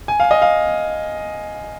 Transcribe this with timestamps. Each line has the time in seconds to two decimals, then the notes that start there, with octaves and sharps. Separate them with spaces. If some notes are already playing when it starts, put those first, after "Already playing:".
0.08 G#5
0.20 F5
0.31 D#5
0.42 F5